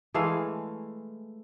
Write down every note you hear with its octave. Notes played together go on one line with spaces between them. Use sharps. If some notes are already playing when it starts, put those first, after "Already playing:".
E3 G#3 A3 F5